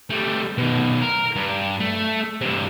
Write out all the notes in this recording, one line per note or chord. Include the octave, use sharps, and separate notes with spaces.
G3 A3
B2 D#3
A#4
G2
A3
G2 C3